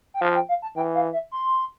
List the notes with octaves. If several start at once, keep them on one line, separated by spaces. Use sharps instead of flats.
G5
F3 F5
G5
F5
A5
E3 G5
F5
E5
C6